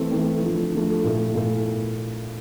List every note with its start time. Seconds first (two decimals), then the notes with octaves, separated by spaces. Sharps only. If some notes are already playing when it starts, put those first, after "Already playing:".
Already playing: E3 A3 C4 E4
0.12 E3 A3 C4 E4
0.43 D3 F3 A3
0.72 D3 F3 A3
1.03 A#2 A3 E4
1.34 A#2 A3 E4